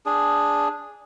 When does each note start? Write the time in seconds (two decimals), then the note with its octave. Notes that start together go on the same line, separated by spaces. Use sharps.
0.06 D4 G#4